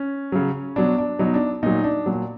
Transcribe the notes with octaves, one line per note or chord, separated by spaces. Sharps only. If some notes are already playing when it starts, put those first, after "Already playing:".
Already playing: C#4
C#3 F#3
B2 F#3 D4
D4
B2 F#3 D#4
D4
A#2 F#3 D#4
D4
A#2 F#3